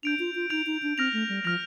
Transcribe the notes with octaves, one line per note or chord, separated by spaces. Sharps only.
D4 G6 D7 F7
F4
F4
D#4 G6 D7 F7
D#4
D4
C4 F6 A#6 F7
A3
G3
F3 F6 A#6 F7